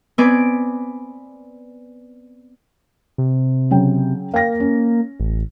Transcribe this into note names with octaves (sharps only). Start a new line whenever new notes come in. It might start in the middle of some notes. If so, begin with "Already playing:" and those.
B3 C4 B4 D5 G#5 D6
C3
C#3 F#3 G5
A#3 F5 G5 A#6
C#4
A1